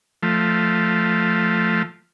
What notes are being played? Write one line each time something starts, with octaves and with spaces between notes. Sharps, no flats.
F3 A3